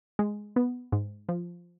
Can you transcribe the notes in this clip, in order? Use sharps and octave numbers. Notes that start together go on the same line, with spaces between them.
G#3
B3
G#2
F3